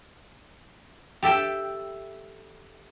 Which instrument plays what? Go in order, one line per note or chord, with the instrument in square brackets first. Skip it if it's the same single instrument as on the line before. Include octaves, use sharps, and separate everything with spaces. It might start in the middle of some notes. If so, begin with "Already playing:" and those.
[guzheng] G4 A4 E5 G5